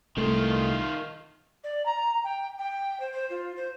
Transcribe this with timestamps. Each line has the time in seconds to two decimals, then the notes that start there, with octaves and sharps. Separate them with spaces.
0.17 C2 D#3 A3 F4
1.64 D5
1.85 A#5
2.24 G5
2.58 G5
3.00 C5
3.12 C5
3.30 F4
3.56 C5